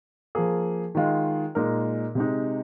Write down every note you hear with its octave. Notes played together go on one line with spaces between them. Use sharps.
F3 A#3 G#4
D#3 G#3 F4
A#2 G#3 D#4 A#4
C3 G#3 D#4